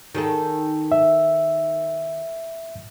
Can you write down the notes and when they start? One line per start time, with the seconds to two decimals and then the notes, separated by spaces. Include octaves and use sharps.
0.15 D#3 G#4 A4
0.92 E5